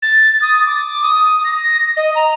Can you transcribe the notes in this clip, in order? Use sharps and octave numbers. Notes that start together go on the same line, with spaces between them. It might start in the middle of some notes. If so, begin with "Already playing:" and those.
A6
D#6
D6
D#6
A#6
D#5
A#5